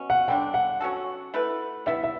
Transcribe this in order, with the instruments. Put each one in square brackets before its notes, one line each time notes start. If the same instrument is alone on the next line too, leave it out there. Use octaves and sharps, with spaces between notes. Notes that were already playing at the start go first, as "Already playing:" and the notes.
Already playing: [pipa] B2 F#3 C#4
[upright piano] F#5
[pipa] D3 G3 D4 [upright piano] G5
[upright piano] F#5
[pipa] F#3 C#4 F#4 A4
A3 E4 B4
[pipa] G3 B3 E4 [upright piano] E5
[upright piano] E5